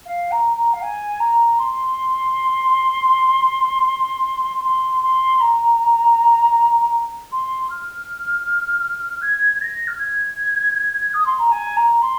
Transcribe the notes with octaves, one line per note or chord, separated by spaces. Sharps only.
F5
A#5
A#5
F5
G#5
A#5
C6
C6
C6
A#5
C6
F6
G#6
A#6
F6
G#6
D#6
C6
A#5
G#5
A#5
C6